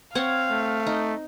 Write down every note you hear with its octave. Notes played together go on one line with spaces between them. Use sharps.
C4 C#5 F5 F#5
A3
D#4